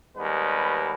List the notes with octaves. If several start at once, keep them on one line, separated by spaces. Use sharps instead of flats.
D#2 G3 G#3 B3 B4